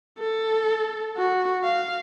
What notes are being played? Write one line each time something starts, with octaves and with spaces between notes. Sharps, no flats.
A4
F#4
F5